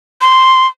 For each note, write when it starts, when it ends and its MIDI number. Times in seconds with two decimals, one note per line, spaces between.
0.21 0.67 84